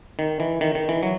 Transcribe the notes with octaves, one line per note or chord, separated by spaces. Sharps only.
D#3
E3
D#3
D#3
E3
F#3